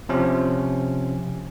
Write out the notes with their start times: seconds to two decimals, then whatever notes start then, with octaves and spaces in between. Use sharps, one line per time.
0.09 C3 F3 C#4